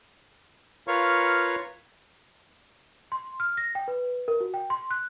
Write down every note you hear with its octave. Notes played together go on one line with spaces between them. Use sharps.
F4 A#4 B4 C#5 F5 C#6
C6
F6
A#6
G5
B4
A#4
F#4
G5
C6
F#6